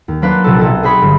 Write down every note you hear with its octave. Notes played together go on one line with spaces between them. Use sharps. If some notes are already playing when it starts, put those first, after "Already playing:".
D#2
F#3 A#3 D4 B4 C5 F5
A#1 C3 F#4 A4
B1 A4 D#5
G#4 C5 B5 C#6 D#6
G1